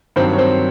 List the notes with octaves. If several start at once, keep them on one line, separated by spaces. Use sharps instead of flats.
G2 D#3 F#3 C4 C5
C#5
C4 C5